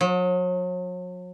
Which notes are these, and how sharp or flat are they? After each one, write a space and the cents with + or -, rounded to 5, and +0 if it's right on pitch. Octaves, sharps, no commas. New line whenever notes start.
F#3 -40